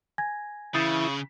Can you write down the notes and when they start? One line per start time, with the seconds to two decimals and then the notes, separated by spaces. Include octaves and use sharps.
0.18 G#5 G#6 A#6
0.74 C#3 E3 E4 D#6 G6 A6